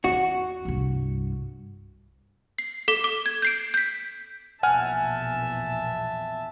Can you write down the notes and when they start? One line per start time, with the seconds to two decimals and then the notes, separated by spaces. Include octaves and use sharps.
0.04 E2 F#4
0.65 C2 G2
2.58 C7
2.88 A4 D6 B6 G7
3.04 D6
3.26 G#6
3.42 G6 C7 D7
3.74 G6 B6
4.63 A#1 E2 B2 E5 F#5 G#5 A5 F6